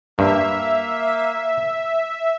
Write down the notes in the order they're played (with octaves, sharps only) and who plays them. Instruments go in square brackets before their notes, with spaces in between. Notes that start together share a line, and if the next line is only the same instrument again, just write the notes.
[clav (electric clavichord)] G2 [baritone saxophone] A#3 [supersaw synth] E5